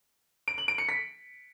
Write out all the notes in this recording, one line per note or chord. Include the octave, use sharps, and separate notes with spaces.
D7
F#7
D7
C#7
B6